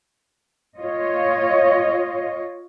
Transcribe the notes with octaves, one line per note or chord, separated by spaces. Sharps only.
F4 C#5 D#5